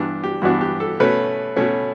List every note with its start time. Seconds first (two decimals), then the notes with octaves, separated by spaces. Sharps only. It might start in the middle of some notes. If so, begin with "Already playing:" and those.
Already playing: G2 E3 B3 D4 G4
0.24 G4
0.42 G2 E3 B3 D4 F#4
0.61 G4
0.80 A4
1.00 B2 A3 C#4 B4
1.56 B2 A3 C#4